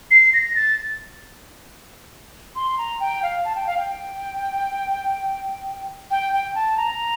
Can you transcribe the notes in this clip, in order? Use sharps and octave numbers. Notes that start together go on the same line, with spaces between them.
C7
A#6
A6
C6
A#5
G5
F5
A5
G5
F5
G5
G5
G5
A5
A#5